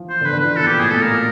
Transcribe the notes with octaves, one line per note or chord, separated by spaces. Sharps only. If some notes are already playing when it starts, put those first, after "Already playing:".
Already playing: E3 F3
C5
D3
B4
D3
E3 B4
B2 A4
A#2 G4
A2 G#4
B2 A4
A#2 A#4